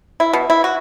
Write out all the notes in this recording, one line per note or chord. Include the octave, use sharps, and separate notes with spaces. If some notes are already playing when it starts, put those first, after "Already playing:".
E4
B2
E4
F#4